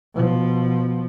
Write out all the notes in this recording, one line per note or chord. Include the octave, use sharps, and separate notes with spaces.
B2 F3